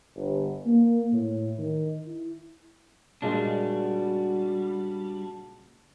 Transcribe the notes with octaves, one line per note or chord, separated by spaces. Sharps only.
G1
A#3
A2
D#3
E4
A#2 C#3 G3 G#3 D4 F#4